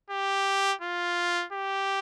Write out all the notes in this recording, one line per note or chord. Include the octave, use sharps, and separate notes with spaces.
G4
F4
G4